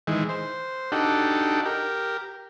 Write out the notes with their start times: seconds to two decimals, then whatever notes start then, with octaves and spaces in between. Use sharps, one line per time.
0.07 D#3 E3 G#3
0.29 C5
0.92 D4 D#4 F#4 G4 A4
1.66 G4 A#4